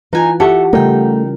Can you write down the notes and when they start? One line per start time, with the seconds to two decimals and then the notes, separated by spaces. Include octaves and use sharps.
0.13 E3 D#4 F4 B4 G#5 A#5
0.40 G4 A4 E5 F#5 C#6
0.73 C#3 G3 A3 D#4 A#4 G5